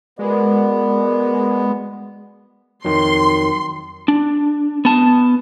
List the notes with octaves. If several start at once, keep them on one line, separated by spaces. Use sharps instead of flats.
G#3 B3 F#4 A#4 D5
F2 D#3 F#3 C6
D4
B3 A5